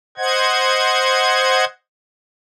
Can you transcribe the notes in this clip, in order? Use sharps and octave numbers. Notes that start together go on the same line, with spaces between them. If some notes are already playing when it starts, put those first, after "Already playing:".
C5 D#5 F#5 G#6